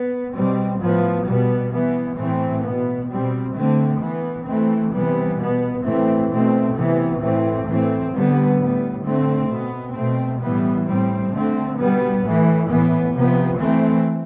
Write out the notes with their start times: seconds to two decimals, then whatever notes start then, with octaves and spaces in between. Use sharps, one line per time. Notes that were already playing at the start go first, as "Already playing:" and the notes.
Already playing: B3
0.34 B2 G3 C4
0.80 A2 F3 B3
1.26 B2 G3 B3
1.72 E3 B3
2.17 A2 E3 A3 C4
2.63 B2 B3
3.09 B2 G3 C4
3.54 D3 A3 C4
4.00 E3 B3
4.46 E3 A3 C4
4.91 C3 E3 G3 B3
5.37 B2 B3
5.83 A2 E3 A3 C4
6.29 B2 A3 C4
6.74 C3 E3 B3
7.20 A2 E3 A3 C4
7.66 A2 E3 A3 C4
8.12 D3 G3 B3
8.57 A2 G3 B3
9.03 D3 A3 C4
9.48 B2 B3
9.94 B2 A3 C4
10.40 A2 E3 G3 B3
10.85 A2 G3 C4
11.31 D3 A3 C4
11.77 B2 G3 B3
12.23 A2 E3 A3
12.69 A2 E3 B3
13.15 C3 F3 B3
13.60 E3 A3 C4